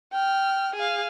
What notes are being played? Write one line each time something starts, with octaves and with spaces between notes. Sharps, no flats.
G5 F6
G#4 F5